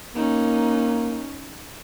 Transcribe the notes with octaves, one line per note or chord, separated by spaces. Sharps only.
A#3 C#4 D#4